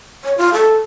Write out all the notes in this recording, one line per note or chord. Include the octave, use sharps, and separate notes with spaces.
C#5
F4
A4